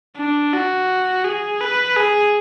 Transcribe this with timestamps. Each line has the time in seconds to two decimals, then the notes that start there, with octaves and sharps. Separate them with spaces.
0.17 D4
0.53 F#4
1.25 G#4
1.61 B4
1.96 G#4